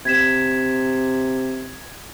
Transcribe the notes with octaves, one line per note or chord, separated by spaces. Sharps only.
C3 G#6 B6 E7